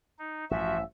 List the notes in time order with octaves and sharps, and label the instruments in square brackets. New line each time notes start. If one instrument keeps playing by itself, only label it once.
[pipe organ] D#4
[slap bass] A1 G2 [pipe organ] F3 F#4 [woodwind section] E5